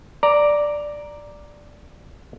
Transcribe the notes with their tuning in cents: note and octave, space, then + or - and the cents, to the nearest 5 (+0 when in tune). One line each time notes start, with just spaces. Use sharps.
D5 +0 A#5 +0